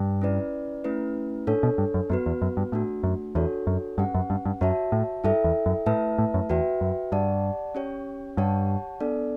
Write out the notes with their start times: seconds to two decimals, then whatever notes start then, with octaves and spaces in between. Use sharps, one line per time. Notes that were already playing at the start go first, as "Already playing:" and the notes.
Already playing: G2
0.21 C#4 E4 B4 D5
0.84 A3 C#4 E4 B4
1.47 A2 D4 A4 C#5
1.63 B2
1.78 G2
1.94 F#2
2.10 F#2 B3 F#4 B4
2.26 E2
2.42 F#2
2.57 G2
2.72 A2 A3 D4 F#4
3.03 F#2
3.35 E2 D4 F#4 A4 C#5
3.67 F#2
3.98 G2 C#4 G4 B4 F#5
4.14 F#2
4.30 G2
4.45 G2
4.61 F#2 F#4 C#5 E5 A5
4.92 A2
5.24 G2 E4 A4 E5 G5
5.44 E2
5.66 F#2
5.86 A2 A3 E4 B4 E5 A5
6.18 A2
6.34 F#2
6.50 E2 F#4 B4 E5 G5
6.81 F#2
7.12 G2 G4 D5 F#5 A5
7.75 C#4 G4 C#5 G5
8.37 G2 G4 C#5 F#5 A5
9.00 B3 D4 A4 D5